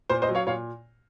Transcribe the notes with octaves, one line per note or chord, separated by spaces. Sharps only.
A#2 C5
C5 D#5
F#3
C#5 F5
A#2 C#5 F5